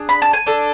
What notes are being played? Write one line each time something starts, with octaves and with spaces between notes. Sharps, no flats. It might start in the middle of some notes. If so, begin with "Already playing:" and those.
Already playing: D4 G#4
B5
A5
G#5
D4 A4